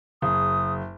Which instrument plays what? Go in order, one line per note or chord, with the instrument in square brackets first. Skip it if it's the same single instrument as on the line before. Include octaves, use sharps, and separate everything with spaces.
[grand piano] F#1 G#4 [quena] D#6